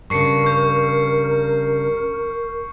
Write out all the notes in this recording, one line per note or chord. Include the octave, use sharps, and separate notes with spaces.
G2 C#3 A#4 C#6 C7 C#7
C#6 G6